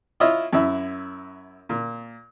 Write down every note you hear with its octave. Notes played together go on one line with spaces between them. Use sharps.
E4 F4 C#5 D#5
F#2 E4
A#2